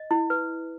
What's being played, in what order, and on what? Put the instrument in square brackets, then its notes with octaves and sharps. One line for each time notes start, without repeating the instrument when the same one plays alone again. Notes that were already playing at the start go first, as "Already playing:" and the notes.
Already playing: [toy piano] D#5
E4
B4